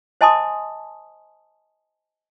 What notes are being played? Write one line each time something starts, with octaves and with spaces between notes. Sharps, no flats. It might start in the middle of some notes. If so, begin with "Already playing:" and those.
C5 D#5 G#5 A5 C6 D#6